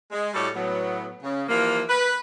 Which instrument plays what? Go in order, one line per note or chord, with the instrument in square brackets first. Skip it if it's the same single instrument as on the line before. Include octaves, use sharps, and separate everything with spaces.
[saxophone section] G#3
A2 G3 F#4 A4 C#5 D5
A2 F#3 B3
C#3
E3 F3 G3 A#3
B4